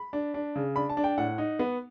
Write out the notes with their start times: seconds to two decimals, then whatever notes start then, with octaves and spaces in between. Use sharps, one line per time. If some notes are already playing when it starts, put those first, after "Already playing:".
Already playing: B5
0.13 D4
0.34 D4
0.56 C#3
0.76 D4 B5
0.89 A5
0.97 D4
1.04 G5
1.18 A2 F#5
1.38 D#4
1.59 B3